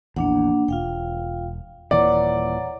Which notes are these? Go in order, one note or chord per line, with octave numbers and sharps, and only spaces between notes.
A#1 E2 A#3 D4 F#5
E1 F4 F5 G5
D#1 A#2 E3 C#5 D5 F#5 A#5